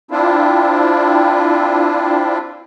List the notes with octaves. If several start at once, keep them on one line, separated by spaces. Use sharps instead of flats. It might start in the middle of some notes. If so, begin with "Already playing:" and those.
C4 D4 E4 F4